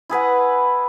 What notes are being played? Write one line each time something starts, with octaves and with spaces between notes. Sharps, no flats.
E4 G#4 B4 F#5